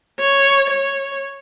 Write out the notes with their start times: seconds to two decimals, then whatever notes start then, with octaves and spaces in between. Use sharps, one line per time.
0.20 C#5
0.70 C#5